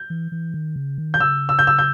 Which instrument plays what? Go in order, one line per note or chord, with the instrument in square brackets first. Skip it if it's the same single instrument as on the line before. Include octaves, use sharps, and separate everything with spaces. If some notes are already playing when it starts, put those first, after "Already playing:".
Already playing: [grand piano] G6
[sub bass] E3
E3
D#3
C#3
D#3
[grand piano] G6
[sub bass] C#3 [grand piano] E6
[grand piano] E6
G6
E6
G6